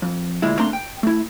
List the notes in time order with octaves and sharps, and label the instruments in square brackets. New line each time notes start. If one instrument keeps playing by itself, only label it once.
[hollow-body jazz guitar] F2
D2 A#2 G#3 E4
A3 A#3 C4 D4 A#5 C6
G5
A3 E4